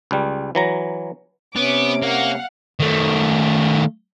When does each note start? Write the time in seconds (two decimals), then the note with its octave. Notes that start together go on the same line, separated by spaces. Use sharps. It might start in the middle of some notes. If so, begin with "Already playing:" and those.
0.11 C#2 G3
0.55 E3 F#3 A#5
1.56 C3 B3 C#4 D6
2.03 A#3 F5 F#5
2.80 D#3 A3